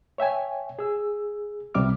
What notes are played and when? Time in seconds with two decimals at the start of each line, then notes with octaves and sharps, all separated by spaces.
0.18 C#5 E5 G5 G#5
0.79 G#4 E6
1.74 C2 C3 G3 E5 D6 F6